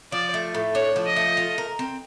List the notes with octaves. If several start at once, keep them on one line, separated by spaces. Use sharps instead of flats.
F3 D5
A3
A2
D4 C#5
F3
D#5
A3
F4
A#4
C4